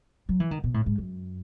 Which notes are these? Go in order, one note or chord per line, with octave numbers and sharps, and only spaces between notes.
F#3
E3
D#3
B2
A2
G#2
F#2